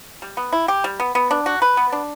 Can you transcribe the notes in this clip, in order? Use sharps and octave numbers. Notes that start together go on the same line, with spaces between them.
G3
B3
E4
G4
G3
B3
B3
D4
F#4
B4
B3
D4